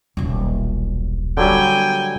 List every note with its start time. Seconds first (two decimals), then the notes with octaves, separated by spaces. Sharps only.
0.17 D#1 B1
1.37 D3 F#3 G3 G5 G#5